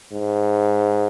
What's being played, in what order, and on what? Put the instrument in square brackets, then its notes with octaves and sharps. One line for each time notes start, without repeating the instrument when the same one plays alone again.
[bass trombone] G#2